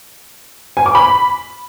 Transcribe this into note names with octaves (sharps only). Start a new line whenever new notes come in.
G#5
D6
B5